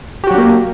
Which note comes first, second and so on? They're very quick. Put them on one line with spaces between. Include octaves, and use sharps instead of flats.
G4 F#4 F#3 D4 A#3